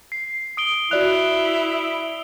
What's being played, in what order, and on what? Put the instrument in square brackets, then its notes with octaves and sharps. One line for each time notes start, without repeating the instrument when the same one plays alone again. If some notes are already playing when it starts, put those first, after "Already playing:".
[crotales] C7
D#6 D7 G7
[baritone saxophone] E4 [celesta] F#4 D5 F#6 [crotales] F7